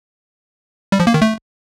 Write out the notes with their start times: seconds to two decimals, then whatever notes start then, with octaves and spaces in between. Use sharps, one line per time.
0.92 G3
1.00 F3
1.07 A#3
1.14 D#3
1.22 A3